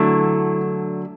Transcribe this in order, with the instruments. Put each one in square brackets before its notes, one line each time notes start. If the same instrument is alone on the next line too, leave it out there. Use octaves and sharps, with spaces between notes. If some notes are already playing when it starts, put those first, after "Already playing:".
Already playing: [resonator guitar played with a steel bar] D3 F#3 A3 E4